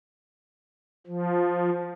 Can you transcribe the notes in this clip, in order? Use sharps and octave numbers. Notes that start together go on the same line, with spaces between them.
F3